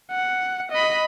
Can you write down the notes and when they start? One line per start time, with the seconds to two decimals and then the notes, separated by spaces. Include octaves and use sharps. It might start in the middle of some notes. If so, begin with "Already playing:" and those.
0.12 F#5
0.72 D#5 B5